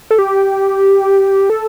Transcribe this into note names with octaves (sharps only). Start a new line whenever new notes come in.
A4
G4
A4